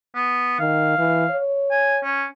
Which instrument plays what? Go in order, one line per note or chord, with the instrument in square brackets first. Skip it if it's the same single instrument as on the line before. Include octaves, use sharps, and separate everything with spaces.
[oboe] B3
[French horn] D#3 [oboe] F5
[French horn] E3
C#5
[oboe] G#5
C#4